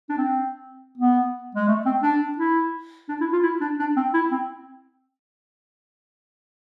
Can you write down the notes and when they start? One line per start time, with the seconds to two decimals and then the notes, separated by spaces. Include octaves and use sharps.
0.09 D4
0.18 C4
0.98 B3
1.55 G#3
1.68 A3
1.85 C4
2.02 D4
2.38 E4
3.09 D4
3.20 E4
3.32 F4
3.43 E4
3.61 D4
3.79 D4
3.96 C4
4.14 E4
4.32 C4